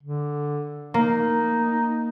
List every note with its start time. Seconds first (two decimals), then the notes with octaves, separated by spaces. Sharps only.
0.03 D3
0.94 A#3 D#4